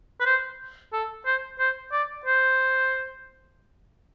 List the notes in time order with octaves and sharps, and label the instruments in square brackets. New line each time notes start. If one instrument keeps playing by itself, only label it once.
[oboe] B4
C5
A4
C5
C5
D5
C5